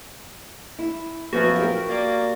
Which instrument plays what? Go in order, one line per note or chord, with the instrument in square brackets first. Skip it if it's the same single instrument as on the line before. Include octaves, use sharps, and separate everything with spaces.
[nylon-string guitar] E4
[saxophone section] F#2 F3 [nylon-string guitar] B3 [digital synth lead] F#4
[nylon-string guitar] G4 A#4
[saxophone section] A#3 D5